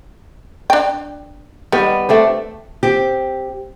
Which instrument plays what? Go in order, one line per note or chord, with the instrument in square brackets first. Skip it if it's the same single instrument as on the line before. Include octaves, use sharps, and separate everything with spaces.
[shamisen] D4 G5
[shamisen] D#3 [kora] G3 B3
[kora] A3 C4 D4
[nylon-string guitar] C4 G4